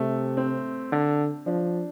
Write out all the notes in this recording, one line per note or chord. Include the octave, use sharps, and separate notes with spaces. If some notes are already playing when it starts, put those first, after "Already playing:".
Already playing: C3 A3
C4
D3
F3 D4